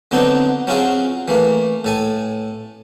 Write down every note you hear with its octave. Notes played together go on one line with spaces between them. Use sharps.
D3 F#3 B3 C4 D4 D#4
F#3 C4 C#4 F4 F#4 G#4
E3 A3 A#3
A2 A4 G#5